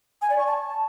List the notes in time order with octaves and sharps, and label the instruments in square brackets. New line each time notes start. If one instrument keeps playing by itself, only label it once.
[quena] G#5
D5
C#6
A5